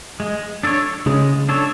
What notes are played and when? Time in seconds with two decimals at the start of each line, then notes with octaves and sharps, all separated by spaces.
0.20 G#3
0.63 D4 A4 C#5
1.06 C#3 G#3
1.49 D4 A4 C#5